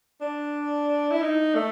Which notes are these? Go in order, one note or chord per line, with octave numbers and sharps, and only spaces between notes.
D4
E4
D#4
A3